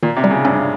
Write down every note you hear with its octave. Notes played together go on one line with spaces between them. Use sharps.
A#2 D#3
C3
G3
C#3
G2 C#4